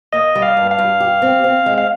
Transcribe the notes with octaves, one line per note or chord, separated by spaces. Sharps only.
A#3 D#5
G3
F5
G2
F5
G2
G4
C4
C4
G#3
F5